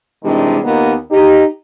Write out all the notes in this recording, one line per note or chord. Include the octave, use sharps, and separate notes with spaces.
C3 D#3 E3 G3 G#3 D4
D#2 D#3 A#3 B3 F4 A#4
D#4 G4